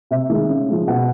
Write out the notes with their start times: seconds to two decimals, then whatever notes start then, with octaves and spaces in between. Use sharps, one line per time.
0.11 C3 E5
0.29 D#3 G#3
0.50 C#3
0.68 F3 G#3
0.87 B2 F#5